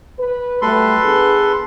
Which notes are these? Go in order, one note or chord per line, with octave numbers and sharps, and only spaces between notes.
B4
F#3 G3 A3 A4 B4 C6
B3 D4 G#4